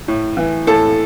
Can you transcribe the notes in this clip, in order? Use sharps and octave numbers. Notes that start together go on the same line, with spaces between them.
A2
E3
A2 A4